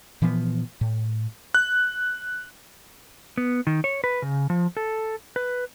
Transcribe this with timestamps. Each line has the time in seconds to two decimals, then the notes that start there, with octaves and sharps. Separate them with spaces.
0.22 A#2 E3 F3 B3
0.81 A2
1.54 F#6
3.38 B3
3.67 D#3
3.84 C#5
4.04 B4
4.22 C#3
4.50 F3
4.77 A4
5.36 B4